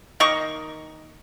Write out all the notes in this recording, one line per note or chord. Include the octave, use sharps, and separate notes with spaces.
D#3 A#3 D#5 C#6